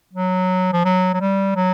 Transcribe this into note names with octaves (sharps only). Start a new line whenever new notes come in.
F#3
F3
F#3
F#3
G3
F#3